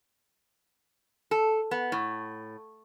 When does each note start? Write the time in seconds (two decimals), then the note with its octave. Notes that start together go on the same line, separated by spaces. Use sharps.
1.31 A4
1.71 B3
1.92 A2